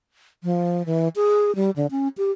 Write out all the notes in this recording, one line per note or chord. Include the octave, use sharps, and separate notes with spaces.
F3
E3
G#4
G3
D3
C#4
G4